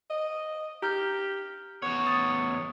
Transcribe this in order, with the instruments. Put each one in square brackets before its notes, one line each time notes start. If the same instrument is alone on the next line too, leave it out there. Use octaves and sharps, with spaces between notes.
[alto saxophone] D#5
[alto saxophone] G4 [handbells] A#5 F6 G6
[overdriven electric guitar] E2 C#5 [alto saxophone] B3
[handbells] D#6 A6